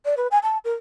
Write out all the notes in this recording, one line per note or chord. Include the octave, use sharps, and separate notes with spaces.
D5
B4
G#5
A5
A#4